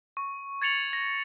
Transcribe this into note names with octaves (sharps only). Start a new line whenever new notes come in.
C#6
G#6 A6 C#7 F7 F#7
A#6